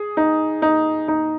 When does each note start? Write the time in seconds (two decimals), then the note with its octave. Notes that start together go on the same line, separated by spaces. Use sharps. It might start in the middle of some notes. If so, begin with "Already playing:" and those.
Already playing: G#4
0.17 D#4
0.62 D#4
1.08 D#4